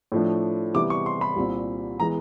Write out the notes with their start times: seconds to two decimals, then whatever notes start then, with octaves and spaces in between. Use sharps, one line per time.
0.12 A2 F3 A3 D4
0.74 C3 E3 G3 B3 E4 D6
0.90 C#6
1.06 C6
1.21 B5
1.36 C2 A#2 G3 C4
2.00 E3 G#3 B3 A#5